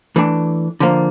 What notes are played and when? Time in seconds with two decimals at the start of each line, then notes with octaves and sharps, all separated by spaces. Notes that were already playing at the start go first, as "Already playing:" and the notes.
0.16 E3 A3 D4
0.80 D3 F3 A#3